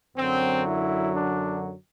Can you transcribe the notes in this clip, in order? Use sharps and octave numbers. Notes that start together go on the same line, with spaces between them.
F#2 D3 F#3 C4
E4
D4